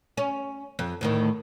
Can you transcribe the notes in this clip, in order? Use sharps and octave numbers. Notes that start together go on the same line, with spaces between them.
C#4
F2
D2 A2 D#3